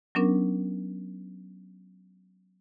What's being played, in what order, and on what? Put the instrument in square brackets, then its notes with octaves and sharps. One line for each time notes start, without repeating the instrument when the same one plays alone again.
[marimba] F#3 B3 C#4 D4 A#4